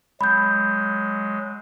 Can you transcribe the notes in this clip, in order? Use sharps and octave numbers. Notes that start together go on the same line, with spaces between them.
F#3 G#3 B5 G6